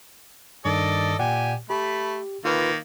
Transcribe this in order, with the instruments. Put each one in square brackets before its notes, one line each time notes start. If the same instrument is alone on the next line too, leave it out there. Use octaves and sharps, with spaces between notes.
[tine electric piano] G2 D#3 [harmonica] A4 D5 D#5
[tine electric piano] A#2 D5 F#5 [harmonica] G4 G#5
[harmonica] A3 B5 [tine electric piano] G4
[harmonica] D#3 A#3 [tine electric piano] F4 B4